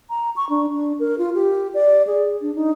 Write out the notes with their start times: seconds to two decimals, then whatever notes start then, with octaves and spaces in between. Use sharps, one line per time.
0.10 A#5
0.36 C#6
0.50 D4
0.74 D4
1.00 A#4
1.18 F4
1.35 G4
1.74 D5
2.07 G#4
2.41 D4
2.55 D#4